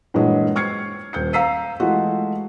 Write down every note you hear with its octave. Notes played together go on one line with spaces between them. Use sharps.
G2 A#2 E3 F#3 G#3
C#6 F6 G#6 C7 C#7
D#1 G6 C#7
F5 A#5 E6 B6 C7 D#7
E3 G#3 A3 F4 F#4